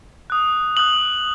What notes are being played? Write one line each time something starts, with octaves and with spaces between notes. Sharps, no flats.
D#6 F#6
D#6 F#6 F#7